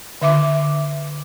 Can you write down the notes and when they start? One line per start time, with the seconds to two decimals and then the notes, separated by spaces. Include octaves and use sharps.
0.22 D3 E5 D6